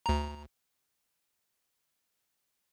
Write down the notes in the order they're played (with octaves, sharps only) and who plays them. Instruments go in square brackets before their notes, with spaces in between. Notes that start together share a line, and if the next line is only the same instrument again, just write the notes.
[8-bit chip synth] D2 A#5